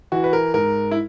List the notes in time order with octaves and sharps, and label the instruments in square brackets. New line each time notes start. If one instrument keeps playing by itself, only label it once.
[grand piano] E3 F#4
B4
A#4
G#2 A#4
E4